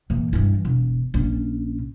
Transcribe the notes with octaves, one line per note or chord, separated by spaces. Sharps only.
E2 A#2
G2 E3
E1
A#1 C#4